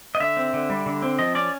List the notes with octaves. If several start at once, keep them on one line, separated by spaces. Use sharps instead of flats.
D#5
D3 E5
C4
D3
G3
D3
C4
F3 D#5
C#4 D5